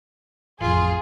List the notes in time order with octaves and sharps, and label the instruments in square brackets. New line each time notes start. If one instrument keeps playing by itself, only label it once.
[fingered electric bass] A1 F2 [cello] F4 [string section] G#4